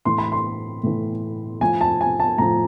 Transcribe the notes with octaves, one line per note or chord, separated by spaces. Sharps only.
A2 E3 C6
B5
C6
A2 E3
A2 F3 G#5
A5
G#5
A5
A2 F3 A#5